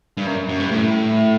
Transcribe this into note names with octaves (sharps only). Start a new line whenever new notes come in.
G2
F#2
F#2
G2
A2